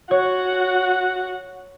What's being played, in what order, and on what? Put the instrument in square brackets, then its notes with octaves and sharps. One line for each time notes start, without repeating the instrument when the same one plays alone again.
[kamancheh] F#4 F#5 [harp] C#5